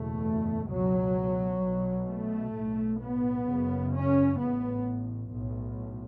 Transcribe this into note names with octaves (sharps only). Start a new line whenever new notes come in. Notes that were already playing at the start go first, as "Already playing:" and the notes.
Already playing: F#1 E2 B2 A3
C#2 B2 F#3
B1 B2
A3
B1 A2
B3
F#1 F#2 C#3
C#4
A1 A2 B3
B1 A2